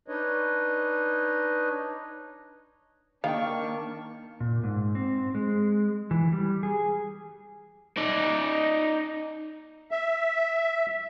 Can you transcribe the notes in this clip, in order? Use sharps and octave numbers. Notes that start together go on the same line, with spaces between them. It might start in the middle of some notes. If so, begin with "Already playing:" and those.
D4 D#4 B4 C#5 D#5
D#3 A#3 D4 F5 G5 C#6
A#2
G#2
C4
G#3
E3
G3
G#4
D#4 D5
E5